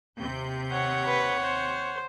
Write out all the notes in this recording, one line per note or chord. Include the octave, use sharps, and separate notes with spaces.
D#2 C3 G6
C#5 F#5
B4
C5